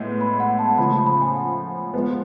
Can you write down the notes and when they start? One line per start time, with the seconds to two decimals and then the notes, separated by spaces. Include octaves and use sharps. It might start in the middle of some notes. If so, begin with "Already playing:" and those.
Already playing: A2 G#3 B3
0.21 B5
0.40 F#5
0.59 A5
0.78 C#3 F3 A3 B5
0.93 B5
1.07 B5
1.22 G#5
1.36 F#5
1.94 F3 G#3 B3